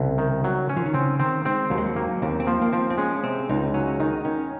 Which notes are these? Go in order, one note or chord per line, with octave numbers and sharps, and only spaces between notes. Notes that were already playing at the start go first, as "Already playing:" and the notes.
Already playing: C2 C#3
D#3
F#3
C#4
F3
D#3
C#3 C4
D#3 C4
G#3 C4
D#2 F#3
G#3
F#3
F#3 A#3
D#2 C4
C4
F3 A#3
A#3
F3 C4
C4
G#3 C#4
C3 C4
C#2 D#4
F#3 C#4
D#3 D#4
D#3 C#4